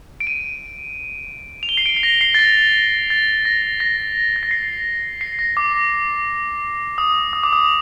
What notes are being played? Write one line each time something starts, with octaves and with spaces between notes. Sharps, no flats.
D7
D#7
F7
G7
C7
D7
C7
A#6
C7
A6
A#6
A6
A#6
A#6
A6
A#6
C7
C7
A#6
D6
D#6
D#6
D6
D#6